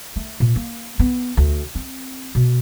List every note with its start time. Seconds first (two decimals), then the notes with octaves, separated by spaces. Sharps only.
0.16 A3
0.40 A#2
0.56 A#3
0.99 B3
1.37 D2
1.75 C4
2.35 B2